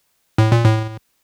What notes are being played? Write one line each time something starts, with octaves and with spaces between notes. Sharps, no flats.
A2
A#2
A2